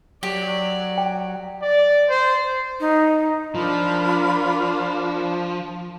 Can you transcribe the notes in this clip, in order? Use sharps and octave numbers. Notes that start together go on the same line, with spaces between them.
F#3 G4 D5
G5
D5
C5
D#4
F3 D4 F4 A#4 B5